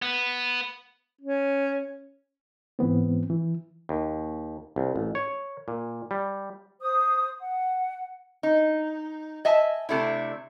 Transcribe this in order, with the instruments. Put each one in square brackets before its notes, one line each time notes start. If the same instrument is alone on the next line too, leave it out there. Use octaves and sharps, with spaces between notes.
[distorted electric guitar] B3
[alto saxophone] C#4
[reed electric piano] G#2 E3 B3 C4
E3
[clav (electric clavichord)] D#2
C2
A1
C#5
A#2
G3
[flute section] C5 D#6
F#5
[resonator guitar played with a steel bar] D#4
D#5 E5 G#5 A5
C3 A3 D4 E4